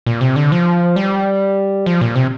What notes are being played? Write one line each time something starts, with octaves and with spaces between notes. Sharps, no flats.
A#2
C3
D3
F3
G3
F3
A#2
C3